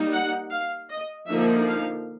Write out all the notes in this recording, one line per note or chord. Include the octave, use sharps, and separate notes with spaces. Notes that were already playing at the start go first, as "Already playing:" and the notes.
Already playing: G3 A#3 D#4
F#5
F5
D#5
D3 F3 A#3 D#4 E5
F5